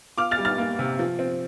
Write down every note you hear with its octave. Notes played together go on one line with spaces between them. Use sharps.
F4 D6 F6
F6 A6
G3
F6 A6
A#3
C3
F3
C4